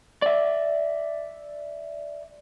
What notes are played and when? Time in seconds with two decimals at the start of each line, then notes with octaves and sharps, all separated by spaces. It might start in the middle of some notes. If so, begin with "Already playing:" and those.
0.22 D5 E5